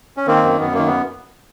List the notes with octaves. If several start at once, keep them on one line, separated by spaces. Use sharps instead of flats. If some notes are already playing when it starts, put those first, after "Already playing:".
C#4
D#3 A#3 C4
F#2
F#2 B3
D#3 A#3
B3